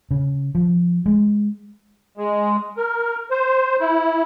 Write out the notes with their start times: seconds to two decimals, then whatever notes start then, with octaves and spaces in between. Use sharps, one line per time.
0.11 C#3
0.55 F3
1.06 G#3
2.17 G#3
2.77 A#4
3.31 C5
3.80 E4